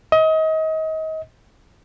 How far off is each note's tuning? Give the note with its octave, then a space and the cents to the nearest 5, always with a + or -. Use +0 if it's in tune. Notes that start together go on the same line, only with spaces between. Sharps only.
D#5 +30